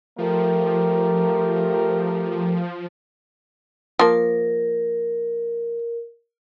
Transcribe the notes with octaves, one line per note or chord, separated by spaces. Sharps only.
F3 A3 G4 A#4
F3 A#3 A#4